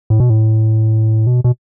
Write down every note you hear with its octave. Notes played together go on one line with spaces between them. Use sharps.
A2
B2
A2
B2
B2